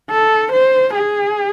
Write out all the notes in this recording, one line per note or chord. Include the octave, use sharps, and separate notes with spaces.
A4
C5
G#4